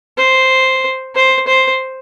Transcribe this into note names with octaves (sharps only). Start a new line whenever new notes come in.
C5
C5
C5